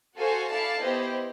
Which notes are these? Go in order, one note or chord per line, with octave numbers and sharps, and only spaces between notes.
F#4 A4 C5 F5 G#5
E4 A4 D5 F5 A5
B3 E4 G4 C5 D#5